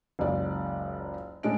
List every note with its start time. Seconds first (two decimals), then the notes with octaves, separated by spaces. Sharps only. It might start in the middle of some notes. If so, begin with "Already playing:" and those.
0.19 F#1 C#2 D5
1.43 A2 G#3 C#4 D4 D#5 D7